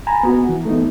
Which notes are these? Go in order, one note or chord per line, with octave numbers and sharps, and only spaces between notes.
G#5 A#5 B5
B3 F#4
E3
A3 B3 D#4